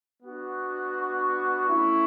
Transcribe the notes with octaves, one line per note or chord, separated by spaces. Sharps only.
B3 D4 F#4
C#6
A3 C#4 E4